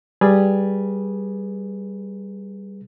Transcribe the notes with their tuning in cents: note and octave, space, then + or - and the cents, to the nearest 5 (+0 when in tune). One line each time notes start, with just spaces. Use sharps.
G3 +0 G#4 +0 B4 -15